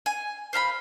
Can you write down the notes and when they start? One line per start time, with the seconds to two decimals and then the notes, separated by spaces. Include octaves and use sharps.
0.06 G#5
0.53 C5 F5 A#5 B5